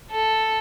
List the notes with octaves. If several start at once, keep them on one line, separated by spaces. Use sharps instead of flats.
A4